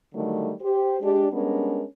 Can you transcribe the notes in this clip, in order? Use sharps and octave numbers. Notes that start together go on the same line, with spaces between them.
D3 D#3 F#3 G3 A3
G4 C5
G#3 D4 G4
G3 G#3 B3 C#4 D4 A#4